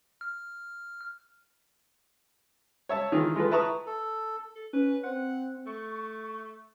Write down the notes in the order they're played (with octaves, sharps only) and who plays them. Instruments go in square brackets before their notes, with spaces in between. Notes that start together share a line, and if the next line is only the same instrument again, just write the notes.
[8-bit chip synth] F6
[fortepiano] C#5 E5 A5
D#3 E3 F4 G#4
G#3 F4 A4 B4
E4 B4 A5 A#5 C#6 D#6
[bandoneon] A4
[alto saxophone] A4
[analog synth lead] C#4 [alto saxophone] B4
[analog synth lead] C4 [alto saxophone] F#5
[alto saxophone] A3 [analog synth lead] C#6